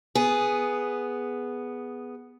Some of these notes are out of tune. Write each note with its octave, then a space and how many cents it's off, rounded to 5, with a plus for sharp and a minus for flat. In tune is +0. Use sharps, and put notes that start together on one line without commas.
B3 +0 G#4 +0